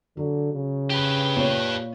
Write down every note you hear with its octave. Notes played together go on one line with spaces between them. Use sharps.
D3 F#3
C#3
G4 B4
A#2 C#5